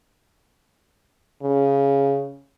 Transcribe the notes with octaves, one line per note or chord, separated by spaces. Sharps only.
C#3